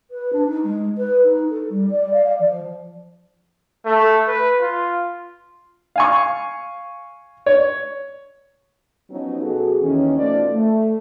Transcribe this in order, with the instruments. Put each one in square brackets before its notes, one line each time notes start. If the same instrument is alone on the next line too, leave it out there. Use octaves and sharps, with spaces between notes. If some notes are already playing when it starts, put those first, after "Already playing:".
[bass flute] B4
D4
D#4
G#3
B4
D#4
A4
G3
D5
F5
D5
F3
[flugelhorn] A3
B4
F4
[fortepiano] F5 G#5 C#6
C#5
[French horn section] F3 F#3 B3 C#4 D#4 F#4
B2 F#4 G#4 A4
D#2 D#3 E3 C#4
B2 F3 A3 D#4 D5
A3